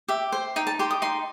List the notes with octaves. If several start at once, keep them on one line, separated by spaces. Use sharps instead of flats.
G4 E5
C5
D#4 G5
A5
G4 C6
D#6
D#4 C6